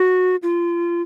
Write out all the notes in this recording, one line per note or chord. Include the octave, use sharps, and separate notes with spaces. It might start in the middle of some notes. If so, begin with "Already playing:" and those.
Already playing: F#4
F4